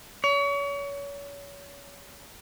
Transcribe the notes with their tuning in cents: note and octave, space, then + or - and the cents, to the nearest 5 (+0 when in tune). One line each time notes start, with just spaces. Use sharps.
C#5 +35